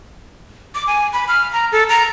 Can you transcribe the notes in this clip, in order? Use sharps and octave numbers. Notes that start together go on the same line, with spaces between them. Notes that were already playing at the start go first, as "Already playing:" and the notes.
D6
G#5
B5
F6
A#5
A4
A#5